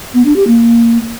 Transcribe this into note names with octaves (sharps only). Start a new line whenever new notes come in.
B3
D4
G4
A#3